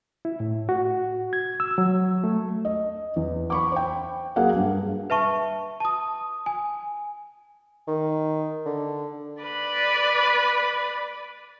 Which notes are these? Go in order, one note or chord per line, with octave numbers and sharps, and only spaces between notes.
E4
A2
F#4
G#6
E6
F#3
A3
D#5
E2
B5 C#6 D6
C5 G5
F#3 A#3 G#4 F5 F#5
G2
B4 E5 A5 C#6
A5 D#6
G#5
D#3
D3
B4 D5